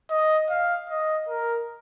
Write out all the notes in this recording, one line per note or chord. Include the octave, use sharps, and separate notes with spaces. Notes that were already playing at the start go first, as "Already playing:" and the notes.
D#5
F5
D#5
A#4